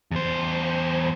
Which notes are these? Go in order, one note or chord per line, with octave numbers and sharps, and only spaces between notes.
E2 C5